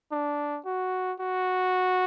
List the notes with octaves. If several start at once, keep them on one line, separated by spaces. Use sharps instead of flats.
D4
F#4
F#4